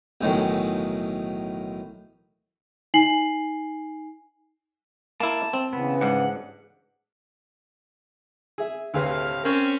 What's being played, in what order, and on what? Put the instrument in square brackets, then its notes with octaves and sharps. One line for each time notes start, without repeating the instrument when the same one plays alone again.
[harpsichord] B1 A2 D#3 E3 F#3
[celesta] D#4 G#5 C7 F#7
[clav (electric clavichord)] A#3 E4 [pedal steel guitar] A5
[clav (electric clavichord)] C4
[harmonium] C#3 E3 [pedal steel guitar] B3
[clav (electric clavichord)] G#2 D4 [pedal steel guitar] F#5
[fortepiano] G#4 E5
[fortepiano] D2 G#4 B4 [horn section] A2 C3 F5
[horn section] C4 C#4 [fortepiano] A#4